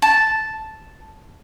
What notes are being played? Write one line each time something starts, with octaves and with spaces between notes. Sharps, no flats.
A5